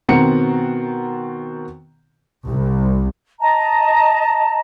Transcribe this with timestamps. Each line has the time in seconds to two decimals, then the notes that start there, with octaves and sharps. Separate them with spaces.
0.08 B2 D#3 C4 F#5 A#5 C#7
2.48 C2
3.40 D#5 A5 A#5